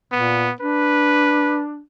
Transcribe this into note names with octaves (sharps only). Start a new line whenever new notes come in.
A#2 B3
D4 B4